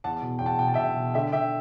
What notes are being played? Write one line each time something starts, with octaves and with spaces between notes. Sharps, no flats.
E2 F#5 A5
B2
E2 G5
F#5 A5
B2 G5
A5
E5 G5
B2
B2
D3 E5 G5
D3 E5 G5